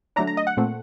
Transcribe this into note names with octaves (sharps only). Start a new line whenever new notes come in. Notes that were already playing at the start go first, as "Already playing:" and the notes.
D3 F#3 A3 D4 A#5
A#5
D#5
F#5
A#2 A3 C4